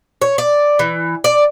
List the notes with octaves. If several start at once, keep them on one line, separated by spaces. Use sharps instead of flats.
C#5
D5
E3
D5